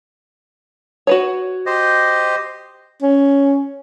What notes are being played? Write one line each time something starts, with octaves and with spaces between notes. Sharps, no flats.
F#4 B4 C#5
G4 C5 D#5
C#4